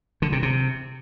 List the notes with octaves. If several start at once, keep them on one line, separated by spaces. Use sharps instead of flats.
D3
C3
C3